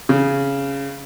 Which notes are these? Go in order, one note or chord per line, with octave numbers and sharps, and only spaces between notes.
C#3